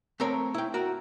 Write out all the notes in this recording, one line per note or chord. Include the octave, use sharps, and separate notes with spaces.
A3 C4 A#4 C#5
E4 G5
F#4 A#4